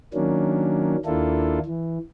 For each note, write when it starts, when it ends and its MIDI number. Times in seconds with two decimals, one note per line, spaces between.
0.14 0.96 51
0.14 0.96 54
0.14 0.96 58
0.14 0.96 61
0.14 0.96 62
1.06 1.59 39
1.06 1.59 58
1.06 1.59 62
1.06 1.59 64
1.06 1.59 65
1.06 1.59 69
1.65 1.98 52